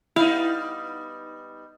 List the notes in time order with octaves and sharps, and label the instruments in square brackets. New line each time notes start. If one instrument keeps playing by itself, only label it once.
[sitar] G3 B3 D#4 [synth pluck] E4 [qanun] F5